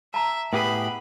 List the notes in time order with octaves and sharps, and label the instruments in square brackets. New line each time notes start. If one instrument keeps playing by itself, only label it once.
[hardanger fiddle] E5 [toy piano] A5 A#5
[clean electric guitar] A2 G4 G#4 [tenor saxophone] B3 [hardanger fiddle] B5